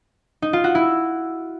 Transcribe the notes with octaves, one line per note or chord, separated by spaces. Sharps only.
D#4
F4
F#4
E4